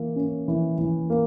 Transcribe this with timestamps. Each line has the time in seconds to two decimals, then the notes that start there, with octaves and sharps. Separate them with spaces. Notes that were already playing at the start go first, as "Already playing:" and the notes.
Already playing: E3 A#3
0.16 C#4
0.48 E3
0.78 E3
1.10 A#3